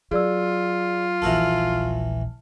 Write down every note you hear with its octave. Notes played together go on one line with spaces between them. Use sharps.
F#3 F4 G#4 D5 E6
D#1 A#1 E3 F#4 A4 A5 F6